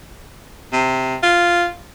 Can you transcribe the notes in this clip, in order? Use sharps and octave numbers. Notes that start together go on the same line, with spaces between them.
C3
F4